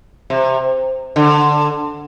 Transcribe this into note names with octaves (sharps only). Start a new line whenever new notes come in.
C3
D3